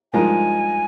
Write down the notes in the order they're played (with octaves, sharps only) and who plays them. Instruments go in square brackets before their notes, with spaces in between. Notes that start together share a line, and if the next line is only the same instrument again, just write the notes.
[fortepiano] G2 F3 G#3 D#4 A#4 [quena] G#5